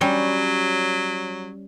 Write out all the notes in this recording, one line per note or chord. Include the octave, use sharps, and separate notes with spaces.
F#3 G3 C#4